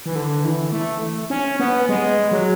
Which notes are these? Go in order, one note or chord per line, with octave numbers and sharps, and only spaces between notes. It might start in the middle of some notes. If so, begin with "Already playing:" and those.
E3
D3
E3
A3
C#4
B3
G#3
F#3